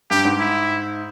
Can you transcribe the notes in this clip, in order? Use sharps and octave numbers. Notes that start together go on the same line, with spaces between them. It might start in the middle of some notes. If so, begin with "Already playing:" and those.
G2 G4
G#2
E4